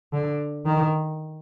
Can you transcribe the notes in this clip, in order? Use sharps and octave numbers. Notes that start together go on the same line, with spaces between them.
D3
D#3